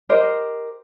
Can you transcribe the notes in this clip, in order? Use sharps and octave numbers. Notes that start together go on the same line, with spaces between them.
G4 A#4 C5 D#5